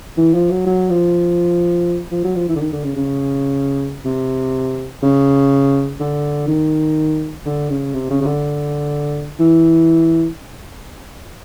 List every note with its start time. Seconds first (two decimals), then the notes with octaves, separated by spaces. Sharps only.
0.17 E3
0.34 F3
0.51 F#3
0.66 F#3
0.90 F3
2.12 F3
2.24 F#3
2.36 F3
2.49 E3
2.56 D3
2.61 D#3
2.73 D3
2.84 C#3
2.96 C#3
4.05 C3
5.03 C#3
6.00 D3
6.48 D#3
7.46 D3
7.70 C#3
7.94 C3
8.10 C#3
8.21 C#3
8.26 D3
9.40 E3